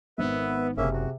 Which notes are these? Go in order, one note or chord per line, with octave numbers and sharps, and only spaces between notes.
G#1 D#3 B3 B4 E5
F#1 C3 A#3 C#4 G#4 E5
F#4